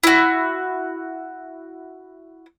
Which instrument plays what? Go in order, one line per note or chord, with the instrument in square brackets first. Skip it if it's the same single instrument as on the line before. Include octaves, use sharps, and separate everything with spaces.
[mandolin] E4 F#4